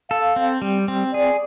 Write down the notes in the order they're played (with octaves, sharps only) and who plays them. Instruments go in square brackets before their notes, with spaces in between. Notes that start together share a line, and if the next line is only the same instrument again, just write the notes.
[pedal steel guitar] A4 [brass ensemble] F5
[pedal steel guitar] C4
G3
C4
[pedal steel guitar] G#4 [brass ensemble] D5